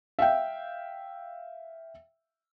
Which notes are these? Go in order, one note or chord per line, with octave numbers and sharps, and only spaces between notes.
E5 F5 G5